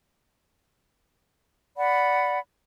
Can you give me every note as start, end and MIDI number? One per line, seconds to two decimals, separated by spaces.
1.76 2.38 74
1.76 2.38 78
1.76 2.38 83